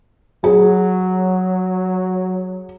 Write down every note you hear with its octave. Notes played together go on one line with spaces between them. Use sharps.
F#3 G#4